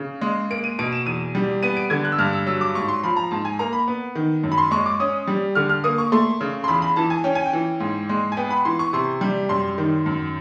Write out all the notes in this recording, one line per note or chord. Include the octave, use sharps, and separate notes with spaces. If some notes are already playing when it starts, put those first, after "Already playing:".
Already playing: C#3
G#3
A#3 D7
D#7
B2 D7
E7
E2 D#7
G3
B3 D#7
D7
D3 G#6
F#6
E6
G2 F6
E6
F#3 E6
D6
G#2 C#6
C6
F3 B5
A#5
G#2 A5
G#5
A#3 A#5
B5
B3
D#3
F#2
B5
C6
G#3 C#6
D6
C#4 D#6
G3
D3 F6
F6
A#3 D#6
C#6
A3 C6
C#3
C6
E2 B5
B5
E3 A5
G#5
C#4 G5
G#5
G5
E3
G#2
G#3
G#5
B3 G5
B5
E3 C6
C#6
C3 C6
G3
F#2 C6
D#3
F#2